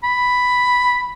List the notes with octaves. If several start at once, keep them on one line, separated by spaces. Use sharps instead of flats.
B5